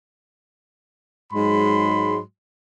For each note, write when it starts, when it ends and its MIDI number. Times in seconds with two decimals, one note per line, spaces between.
1.32 2.20 44
1.32 2.20 54
1.32 2.20 56
1.32 2.20 83
1.32 2.20 84